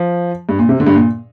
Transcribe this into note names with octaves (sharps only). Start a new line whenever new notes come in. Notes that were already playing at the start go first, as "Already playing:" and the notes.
Already playing: F3
G2
A#2
C3
D3
G2
A#2